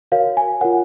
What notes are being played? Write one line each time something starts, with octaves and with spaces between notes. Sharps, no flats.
F#4 A#4 C#5 F5
G#5
F4 A#4 C#5 F#5